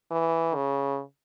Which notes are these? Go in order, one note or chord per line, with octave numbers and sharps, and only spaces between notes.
E3
C#3